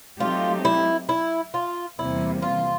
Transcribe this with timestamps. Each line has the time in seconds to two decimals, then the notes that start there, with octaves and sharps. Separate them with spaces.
0.20 F#3 A3 C4 D#4 F4 G4
0.65 E4
1.09 E4
1.54 F4
1.98 E2 C3 E3 G3 A#3 E4
2.42 F4